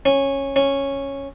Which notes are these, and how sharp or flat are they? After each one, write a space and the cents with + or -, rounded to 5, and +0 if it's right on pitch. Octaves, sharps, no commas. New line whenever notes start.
C#4 -10
C#4 -5